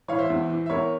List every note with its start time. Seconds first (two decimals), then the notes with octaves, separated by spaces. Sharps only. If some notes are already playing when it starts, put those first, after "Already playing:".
0.08 E3 C#5 F5
0.19 C5 E5
0.30 E2
0.50 E3
0.66 E5
0.70 E2 A#4 C#5